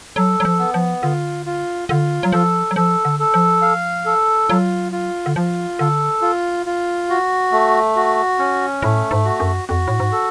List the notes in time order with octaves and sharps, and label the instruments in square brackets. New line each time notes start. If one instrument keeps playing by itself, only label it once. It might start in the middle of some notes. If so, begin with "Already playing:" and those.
[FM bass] F#3 [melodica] A4
[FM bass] F#3
F3
[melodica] B3
[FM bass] F3
[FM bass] D3 [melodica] F4
[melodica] F4
[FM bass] D3 [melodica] F4
[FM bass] F#3
[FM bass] F3 [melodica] A4
[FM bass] F#3
[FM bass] F3 [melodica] A4
[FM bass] D3
[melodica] A4
[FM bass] F3
[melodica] F5
A4
[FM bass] F#3 [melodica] F4
[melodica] F4
[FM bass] D3
[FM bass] F3 [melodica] F4
[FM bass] D3 [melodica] A4
[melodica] F4
F4
F#4
A3
F#4
C#4
[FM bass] A2 [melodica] A3
[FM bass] G#2
[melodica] F#4
[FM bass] F#2
[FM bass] F2 [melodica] F#4
[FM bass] A2
G#2
[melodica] A4